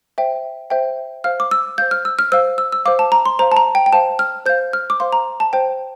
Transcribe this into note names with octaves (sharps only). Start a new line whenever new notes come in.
C5 E5 G5
C5 E5 G5
C5 F5 F6
D6
E6
C5 F5 G6
F6
E6
F6
C5 F5 E6
E6
E6
C5 F5 D6
A5
A#5
C6
C5 F5 A#5
A5
A#5
G5
G5
C5 F5 A5
F6
C5 F5 G6
F6
D6
C5 F5 C6
A#5
A5
C5 G5